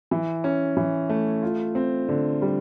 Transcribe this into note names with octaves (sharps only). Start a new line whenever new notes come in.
E3
C#4
E3
A3
F4
C4
D3
G3